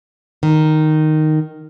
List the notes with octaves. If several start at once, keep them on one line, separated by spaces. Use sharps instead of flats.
D#3